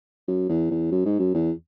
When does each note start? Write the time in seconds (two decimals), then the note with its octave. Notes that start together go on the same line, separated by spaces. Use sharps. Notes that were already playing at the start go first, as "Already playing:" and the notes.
0.28 F#2
0.49 E2
0.70 E2
0.91 F#2
1.05 G#2
1.19 F#2
1.34 E2